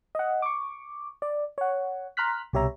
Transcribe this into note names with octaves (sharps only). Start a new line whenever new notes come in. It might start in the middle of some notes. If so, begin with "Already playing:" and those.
D#5 F#5
C#6 D6
D5
C#5 F#5
A#5 C6 F6 F#6 B6
C2 B2 G4 C#5 E5 A#5